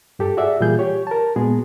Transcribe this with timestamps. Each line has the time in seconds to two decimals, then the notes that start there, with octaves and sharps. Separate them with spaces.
0.19 G2 G4 A4
0.37 F#4 G#4 D5 E5 F#5
0.60 A#2 E3 G3 F4 G#4 G6
0.79 G4 C#5
1.07 A#4 A5
1.36 A#2 G#3 B3 F#4 G#4